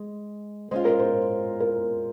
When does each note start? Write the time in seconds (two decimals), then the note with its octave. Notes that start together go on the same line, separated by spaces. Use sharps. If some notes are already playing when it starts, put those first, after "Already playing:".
Already playing: G#3
0.71 G#3 C#4 F4 C5
0.85 A#4
0.99 C5
1.60 A#4